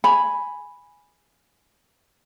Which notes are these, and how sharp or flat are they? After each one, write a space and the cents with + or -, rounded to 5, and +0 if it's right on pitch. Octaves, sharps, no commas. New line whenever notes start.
G#5 +0 B5 +0